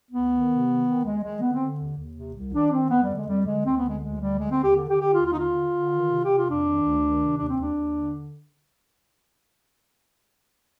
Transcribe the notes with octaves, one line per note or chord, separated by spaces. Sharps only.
D2 B3
D#3
C3
D#3
D#3
D#2 G#3
D#3 G#3
D3 B3
C4
D3
D#2
D#2
C3
C2
D#3 D4
D#3 C4
F2 B3
G3
D3
G#3
F2 G3
D3 G#3
D2 C4
B3
D3
G#3
D2 G#3
D3 G3
D3 G#3
C4
D#2
G4
D3
G4
D3
G4
D#2 F4
F4
D3 D#4
F4
D3
D3
D#3
C3
C3 G4
F4
F2
D4
D#3
D2
D#3
C3
D#2 D4
C4
D#2
D4
D#2
D3